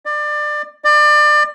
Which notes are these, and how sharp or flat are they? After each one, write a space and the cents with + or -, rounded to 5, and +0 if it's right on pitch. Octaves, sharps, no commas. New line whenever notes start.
D5 +25
D5 +30